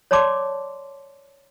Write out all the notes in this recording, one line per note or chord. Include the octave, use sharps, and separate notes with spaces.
C#5 D5 A5 C6 D6